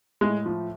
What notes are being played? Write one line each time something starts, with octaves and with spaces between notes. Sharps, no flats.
A2 G#3
F3